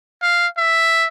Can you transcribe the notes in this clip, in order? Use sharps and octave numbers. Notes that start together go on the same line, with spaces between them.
F5
E5